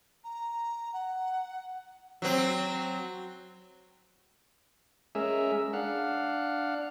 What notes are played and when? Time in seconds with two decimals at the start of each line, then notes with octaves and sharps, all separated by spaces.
0.23 A#5
0.93 F#5
2.22 F#3 C4
5.15 G#3 C#4 G#4 A#4 E5
5.73 D4 F5 F#5